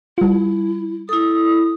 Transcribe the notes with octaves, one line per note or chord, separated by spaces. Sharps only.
G3 E4 F4
E4 A4 D#6